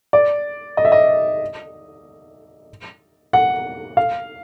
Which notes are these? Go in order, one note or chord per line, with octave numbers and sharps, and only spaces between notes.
D5
D#5
E5
D#5
F#5
F5